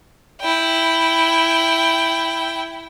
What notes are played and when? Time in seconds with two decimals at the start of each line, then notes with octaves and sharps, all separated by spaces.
0.41 E4 G5